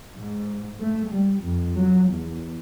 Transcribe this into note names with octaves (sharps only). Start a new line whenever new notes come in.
G#2
A3
G3
F2
F#3
E2